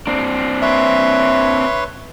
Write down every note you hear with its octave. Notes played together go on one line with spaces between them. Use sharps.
C4 D4
B4 C#5 E5 C6